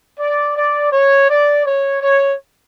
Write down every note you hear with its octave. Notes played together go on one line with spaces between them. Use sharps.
D5
D5
C#5
D5
C#5
C#5